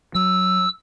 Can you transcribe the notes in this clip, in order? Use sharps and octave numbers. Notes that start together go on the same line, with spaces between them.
F#3 E6